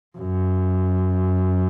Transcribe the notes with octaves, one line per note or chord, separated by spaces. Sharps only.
F#2